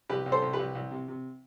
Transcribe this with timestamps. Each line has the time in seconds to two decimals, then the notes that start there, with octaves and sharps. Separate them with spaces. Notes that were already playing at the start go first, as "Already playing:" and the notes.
0.09 C2 G4 B4
0.26 C2
0.32 A4 C5
0.42 C2
0.53 G4 B4
0.59 C2
0.75 C2
0.91 C3
1.08 C3